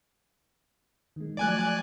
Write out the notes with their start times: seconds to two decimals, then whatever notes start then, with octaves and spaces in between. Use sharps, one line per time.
1.16 D#3 G#3
1.37 F3 F#3 A3 D5 G#5 F#6